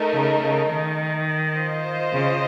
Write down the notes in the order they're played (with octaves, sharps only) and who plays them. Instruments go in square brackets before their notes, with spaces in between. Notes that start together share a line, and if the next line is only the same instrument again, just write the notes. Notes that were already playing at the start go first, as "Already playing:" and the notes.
Already playing: [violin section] A3 D#4 A#4 D#5
[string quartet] C#3
C#3
D#3
[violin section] F4 C5 D#5
[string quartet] C#3